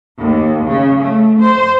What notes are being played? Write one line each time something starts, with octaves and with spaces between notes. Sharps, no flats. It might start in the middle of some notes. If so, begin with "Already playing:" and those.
D#2
C#3
A3
C5